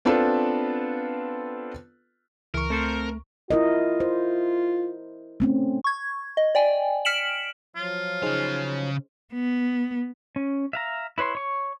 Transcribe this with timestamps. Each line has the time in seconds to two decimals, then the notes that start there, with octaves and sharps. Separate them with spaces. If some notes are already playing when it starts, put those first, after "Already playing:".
0.05 B3 C4 D4 F4 A4 B4
2.54 C#2 E3 A#4 C#6
2.70 A3 C4 A4 C5
3.51 E4 F4 A#4 D#5
4.00 C5
5.40 A3 C4 C#4
5.84 C#6 G#6
6.37 D#5
6.55 D5 G5 G#5
7.05 F6 B6 C#7 D7 E7 F#7
7.76 F3 F#3 F4
8.23 C#3 D#4 G#4 C5 F5
9.34 B3
10.36 C#4
10.73 E5 F5 A#5
11.18 E4 B4 C#5 C6
11.35 C#5 C#6